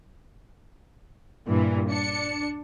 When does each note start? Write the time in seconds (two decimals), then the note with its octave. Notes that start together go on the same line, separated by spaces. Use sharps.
1.48 G2 A#2 E3
1.88 D4 C#7